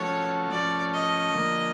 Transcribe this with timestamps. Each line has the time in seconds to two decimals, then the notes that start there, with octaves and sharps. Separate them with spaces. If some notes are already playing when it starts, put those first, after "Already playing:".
Already playing: F3 A3 C#4 F#4 A4 C#5
0.52 F3 A3 C#4 D5
0.93 D#5
1.34 D3 F3 A#3